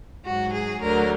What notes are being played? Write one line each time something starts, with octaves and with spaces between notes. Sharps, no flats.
G#2 F#3 F#4
G#4
D2 D3 F#3 A#4